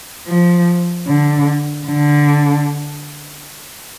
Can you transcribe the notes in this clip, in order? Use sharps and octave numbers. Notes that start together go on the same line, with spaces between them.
F3
D3
D3